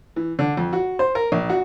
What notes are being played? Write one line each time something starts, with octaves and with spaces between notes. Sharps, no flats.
E3
D3
F2
F#4
C5
A#4
A#1
F#4